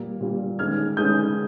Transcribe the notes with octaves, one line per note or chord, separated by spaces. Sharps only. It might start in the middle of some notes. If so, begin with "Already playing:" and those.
Already playing: A#2 G3 A#3
A#2 G3 A#3
D#3 G#3 C#4 F6 G#6
D#3 G#3 C#4 D#6 G6